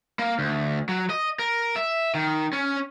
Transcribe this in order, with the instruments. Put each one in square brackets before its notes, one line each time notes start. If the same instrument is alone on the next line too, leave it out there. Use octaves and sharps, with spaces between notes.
[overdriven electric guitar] A#3
D2
F#3
D#5
A#4
E5
D#3
C#4